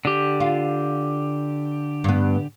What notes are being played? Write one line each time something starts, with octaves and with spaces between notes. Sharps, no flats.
D3 G4
F4
G2 B3